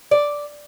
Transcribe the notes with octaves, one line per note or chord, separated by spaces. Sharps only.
D5